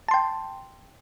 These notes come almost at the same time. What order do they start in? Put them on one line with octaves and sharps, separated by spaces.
A5 C6 G5